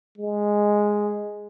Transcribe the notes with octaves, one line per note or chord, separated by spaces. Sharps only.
G#3